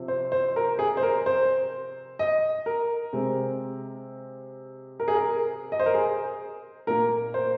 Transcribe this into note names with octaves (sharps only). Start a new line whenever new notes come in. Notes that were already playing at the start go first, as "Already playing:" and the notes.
Already playing: C3 F3 C4
C5
C5
A#4
G#4
C5
A#4
C5
D#5
A#4
C3 G#3 C4
A#4
G#4
A#4
D#5
C5
A#4
G#4
A#2 A#3 A#4
C5